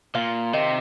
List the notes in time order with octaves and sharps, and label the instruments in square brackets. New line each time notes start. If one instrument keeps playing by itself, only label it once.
[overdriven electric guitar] A#2 [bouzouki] F4
[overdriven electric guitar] C3 [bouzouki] D#3